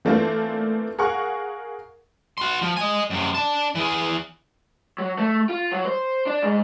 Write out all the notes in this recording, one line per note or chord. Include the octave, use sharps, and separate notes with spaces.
E3 A3 A#3 C4 D4 F4
G#4 A#4 F5 F#5 C#6
F#4 C6
F3
D#5 G#5
F#2 C3
D4 A5
E3 G#4
F#3
A3
F4
F#3
C5
D4
G#2